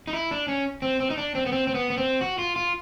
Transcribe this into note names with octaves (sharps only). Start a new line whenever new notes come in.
D#4
E4
D4
C#4
C4
C4
D#4
D4
C4
B3
C4
C4
B3
B3
C4
F#4
F4
F4